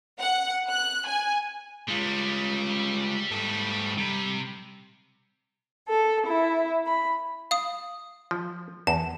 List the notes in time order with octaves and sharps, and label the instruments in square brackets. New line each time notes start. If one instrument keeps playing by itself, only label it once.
[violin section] F#5
F#6
G#5
[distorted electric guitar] G3 [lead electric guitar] G#3 F4
[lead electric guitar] G#2 A4
[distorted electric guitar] C3 [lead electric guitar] G3
[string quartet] A4
E4
B5
[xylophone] F5 D#6
[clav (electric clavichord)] F3
[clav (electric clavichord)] E2 [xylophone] A5